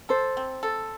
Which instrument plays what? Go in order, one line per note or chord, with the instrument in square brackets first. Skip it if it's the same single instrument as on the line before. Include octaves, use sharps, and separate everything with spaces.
[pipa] A4 [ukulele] C5
[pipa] C4
A4